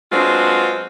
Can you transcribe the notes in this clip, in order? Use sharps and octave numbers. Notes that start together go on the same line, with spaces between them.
F#3 G#3 B3 C4 D4 F4